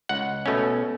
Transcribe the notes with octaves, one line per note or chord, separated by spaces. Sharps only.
C#2 F#5
B2 A3 C#4